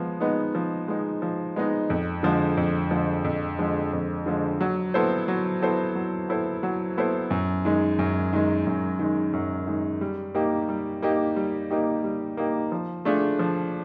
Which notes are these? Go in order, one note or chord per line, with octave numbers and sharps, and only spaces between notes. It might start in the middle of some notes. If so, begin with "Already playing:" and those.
Already playing: F3 G#3 B3
G#3 B3 D#4
F3
G#3 B3 D#4
F3
G#3 B3 D#4
F2
D3 F3 G#3
F2
D3 F3 G#3
F2
D3 F3 G#3
F2
D3 F3 G#3
F#3
B3 E4 A4 C5
F#3
B3 E4 A4 C5
F#3
B3 E4 A4 C5
F#3
B3 E4 A4 C5
F#2
D#3 G#3
F#2
D#3 G#3
F#2
D#3 G#3
F#2
D#3 G#3
G3
A#3 D#4 G4
G3
A#3 D#4 G4
G3
A#3 D#4 G4
G3
A#3 D#4 G4
F3
A3 D4 F4 G#4
F3